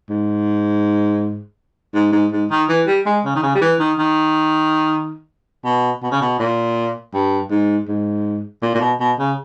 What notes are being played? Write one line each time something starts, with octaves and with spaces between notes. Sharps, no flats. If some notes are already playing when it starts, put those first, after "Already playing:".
G#2
G#2
G#2
G#2
D#3
E3
G3
G#3
C#3
D#3
C#3
G3
E3
D#3
D#3
B2
B2
C#3
B2
A#2
G2
G#2
G#2
A#2
A#2
B2
B2
C#3